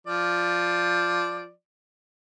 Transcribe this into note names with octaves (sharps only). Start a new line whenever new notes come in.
F3 D5